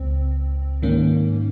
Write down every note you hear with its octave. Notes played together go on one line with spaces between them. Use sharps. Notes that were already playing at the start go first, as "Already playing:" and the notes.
Already playing: C#2 C4
G#2 D#3 A#3 C#4